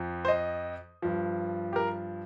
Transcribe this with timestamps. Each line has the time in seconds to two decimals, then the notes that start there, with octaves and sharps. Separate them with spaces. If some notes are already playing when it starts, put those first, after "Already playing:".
Already playing: F2 F3
0.25 C5
0.28 D#5
1.02 G2 F3
1.73 G4
1.76 A#4